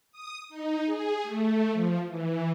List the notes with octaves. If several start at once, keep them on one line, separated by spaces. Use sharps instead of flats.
D#6
D#4
G#4
A3
F3
E3